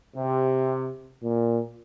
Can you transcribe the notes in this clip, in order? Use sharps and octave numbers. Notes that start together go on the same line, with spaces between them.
C3
A#2